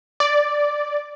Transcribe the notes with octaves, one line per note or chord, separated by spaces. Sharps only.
D5